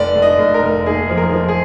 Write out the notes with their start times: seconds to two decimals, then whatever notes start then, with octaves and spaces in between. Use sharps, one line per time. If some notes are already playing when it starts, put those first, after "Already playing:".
Already playing: F1 D5
0.15 F1
0.22 D#5
0.39 F1
0.54 A#4
0.62 F1
0.86 D#2 G#4
1.09 F3
1.17 A#4
1.33 F3
1.48 G#4